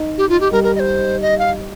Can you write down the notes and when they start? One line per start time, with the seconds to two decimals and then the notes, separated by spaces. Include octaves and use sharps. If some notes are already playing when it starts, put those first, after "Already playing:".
Already playing: D#4
0.18 G4
0.29 F4
0.41 G4
0.52 G3 A#4
0.64 A#4
0.75 D#5
0.80 C5
1.21 D#5
1.39 F5